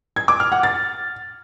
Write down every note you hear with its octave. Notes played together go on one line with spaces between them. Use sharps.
G#6
D6
F6
F#5
A6